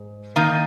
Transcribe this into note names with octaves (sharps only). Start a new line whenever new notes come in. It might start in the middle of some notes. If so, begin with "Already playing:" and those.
Already playing: G#2
D#3 A#3 D#4